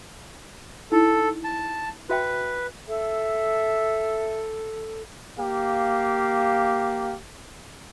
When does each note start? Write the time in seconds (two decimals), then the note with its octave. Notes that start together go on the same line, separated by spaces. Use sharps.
0.92 D#4 E4 A4
1.44 A5
2.10 F#4 B4 E5 G5
2.88 A4 E5
5.39 A#3 G4 F5